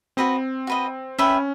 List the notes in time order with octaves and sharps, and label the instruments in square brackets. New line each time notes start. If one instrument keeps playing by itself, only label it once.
[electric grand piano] C4 [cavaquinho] F#4 B4 D#5
[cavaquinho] F#4 B4 D#5
[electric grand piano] C#4 [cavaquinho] B4 E5 G5